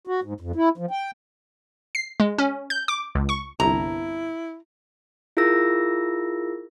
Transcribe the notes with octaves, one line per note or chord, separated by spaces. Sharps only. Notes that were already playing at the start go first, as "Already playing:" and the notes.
F#4
G#2
F2
E4
F3
G5
C7
G#3
C#4
G6
D6
C#2
C#6
G1 C2 E4 A#5
E4 F4 G#4 A#4 E6 A#6